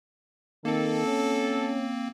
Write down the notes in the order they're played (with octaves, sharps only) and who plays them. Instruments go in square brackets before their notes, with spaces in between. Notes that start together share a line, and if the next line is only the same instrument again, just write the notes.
[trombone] D#3 [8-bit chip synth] A#3 C4 [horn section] A4
[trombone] C#4